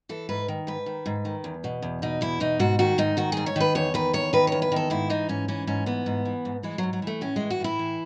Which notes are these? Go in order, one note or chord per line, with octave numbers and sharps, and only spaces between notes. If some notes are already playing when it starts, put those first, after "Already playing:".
E3 A4
G#2 B4
D#3
G#2 B4
D#3
G#2
D#3
E2
B2
E2
B2 D#4
E2 E4
B2 D#4
G#2 F#4
D#3 F#4
G#2 D#4
D#3 F#4
G#2 G#4
C#5
D#3 B4
E2 C#5
D#3 B4
E2 C#5
D#3 B4
E2 C#5
B4
D#3 A4
G#2 E4
E3 D#4
G#2 C#4
E3 C#4
G#2 C#4
E3 B3
G#2
E3
G#2
E3 G#3
G#2 F#3
F#3
E3 A3
A2 C#4
E3 G#3
F#4
A2 E4
E3